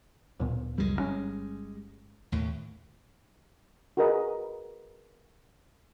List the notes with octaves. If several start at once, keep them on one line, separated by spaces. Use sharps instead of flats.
D1 A#2 B3
C#2 F#2 G3 G#3
G1 D#3 C#4
D#2 A2
F#4 G#4 A#4 B4 D#5